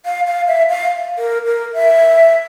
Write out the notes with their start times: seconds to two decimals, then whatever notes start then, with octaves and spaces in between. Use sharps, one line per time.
0.06 F5
0.27 F5
0.47 E5
0.69 F5
1.19 A#4
1.46 A#4
1.74 E5